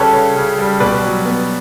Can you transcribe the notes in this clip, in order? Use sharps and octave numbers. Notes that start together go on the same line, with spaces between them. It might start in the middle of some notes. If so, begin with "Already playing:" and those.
Already playing: C#3 G3 C#4 G4 A4 B4 C#5
C#3
C#3
G3
B2 B4 D5
F#3
B3